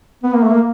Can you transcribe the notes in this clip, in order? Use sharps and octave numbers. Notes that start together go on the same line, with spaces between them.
B3
A#3
A3
A#3